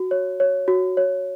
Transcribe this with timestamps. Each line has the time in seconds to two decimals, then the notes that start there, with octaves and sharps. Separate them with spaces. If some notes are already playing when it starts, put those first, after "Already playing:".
Already playing: F#4
0.11 C#5
0.40 C#5
0.68 F#4
0.97 C#5